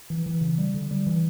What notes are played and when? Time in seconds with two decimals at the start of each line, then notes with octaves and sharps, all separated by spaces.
0.10 E3
0.26 E3
0.41 C#3
0.58 G3
0.74 D3
0.91 G3
1.07 E3